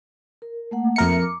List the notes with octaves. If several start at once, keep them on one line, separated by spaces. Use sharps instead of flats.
A#4
A3 A#3 F#5
F2 A#4 E5 C#7
D6